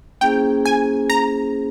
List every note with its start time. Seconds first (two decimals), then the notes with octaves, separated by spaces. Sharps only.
0.21 A#3 C#4 E4 G#4 C5 G5
0.65 G#5
1.10 A#5